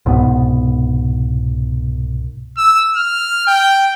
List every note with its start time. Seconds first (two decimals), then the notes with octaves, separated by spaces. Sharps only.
0.06 C2 G#2 B2 B3
2.57 E6
2.97 F6
3.47 G5